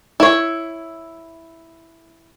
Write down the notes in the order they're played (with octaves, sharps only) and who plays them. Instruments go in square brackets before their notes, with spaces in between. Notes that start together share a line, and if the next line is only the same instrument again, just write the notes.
[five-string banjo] E4 C#5